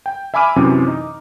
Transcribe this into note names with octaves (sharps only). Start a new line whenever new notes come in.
G5
E5 G#5 B5 D6 F6 D#7
F#2 C3 E3 C4 C#4
D#4